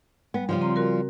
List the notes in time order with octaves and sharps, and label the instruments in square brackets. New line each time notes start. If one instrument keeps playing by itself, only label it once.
[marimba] G3 [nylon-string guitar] B3
[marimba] C#3 [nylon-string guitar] F3 G3 F4
[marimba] C4 A#5
F#4 A#4